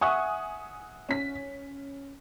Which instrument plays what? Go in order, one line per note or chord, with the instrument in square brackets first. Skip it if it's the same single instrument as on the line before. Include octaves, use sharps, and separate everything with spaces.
[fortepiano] E5 F#5 C#6 [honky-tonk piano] G#5 D#6
[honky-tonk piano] C#4 B6